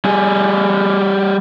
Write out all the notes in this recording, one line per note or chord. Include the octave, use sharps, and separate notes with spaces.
G3 G#4